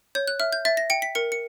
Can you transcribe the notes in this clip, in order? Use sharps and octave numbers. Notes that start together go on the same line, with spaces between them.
C#5 G6
F#6
E5 F6
G6
E5 A6
A#6
G5 C#7
B6
A#4 C#7
C#7